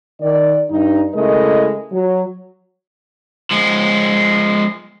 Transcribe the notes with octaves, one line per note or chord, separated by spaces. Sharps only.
D#3 D5
G2 D#4
C#3 G#3 A3 E4 A#4 D#5
F#3
F3 G#3